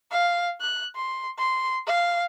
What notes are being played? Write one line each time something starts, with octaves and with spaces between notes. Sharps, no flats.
F5
F#6
C6
C6
F5